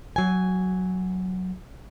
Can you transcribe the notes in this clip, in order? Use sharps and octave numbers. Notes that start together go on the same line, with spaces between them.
F#3 G#5